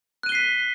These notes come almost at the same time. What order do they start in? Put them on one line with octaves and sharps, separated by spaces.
F#6 D#7 G7 C7 B6